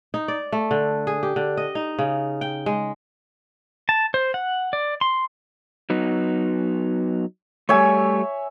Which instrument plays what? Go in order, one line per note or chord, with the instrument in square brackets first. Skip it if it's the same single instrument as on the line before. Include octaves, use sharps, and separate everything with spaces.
[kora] D#4
D5
A3
D3
G#4
G4
D3
D#5
D#4
C#3
G5
G#3
[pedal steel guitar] A5
C5
F#5
D5
C6
[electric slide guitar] F#3 B3 D#4
[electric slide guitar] G3 A3 [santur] C#5 E5 G#5